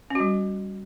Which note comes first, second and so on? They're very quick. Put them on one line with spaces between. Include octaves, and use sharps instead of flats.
C#4 F#4 G3